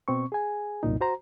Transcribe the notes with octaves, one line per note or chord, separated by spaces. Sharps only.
B2 C4 C#6
G#4 G#5
C2 F#2 A#2 D#4
F#4 C5 A#5